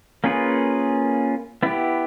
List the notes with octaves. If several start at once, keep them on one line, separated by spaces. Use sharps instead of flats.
A#3 C#4 F4 G#4 B4
B3 E4 G4